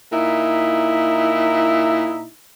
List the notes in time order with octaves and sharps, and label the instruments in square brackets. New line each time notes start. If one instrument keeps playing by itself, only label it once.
[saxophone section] A#2 D#4 E4